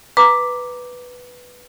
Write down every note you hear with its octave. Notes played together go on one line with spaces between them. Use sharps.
B4 A#5 D6